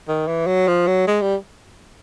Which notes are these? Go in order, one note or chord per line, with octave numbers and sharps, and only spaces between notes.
D#3
E3
F#3
F3
F#3
G#3
G3